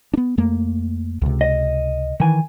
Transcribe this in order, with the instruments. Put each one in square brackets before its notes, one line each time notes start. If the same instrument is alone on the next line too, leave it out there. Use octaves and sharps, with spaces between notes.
[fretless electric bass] B3 D4
F2 A3 A#3
C#2 C3
[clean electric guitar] D#5
[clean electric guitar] D#3 G#5 [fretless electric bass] E3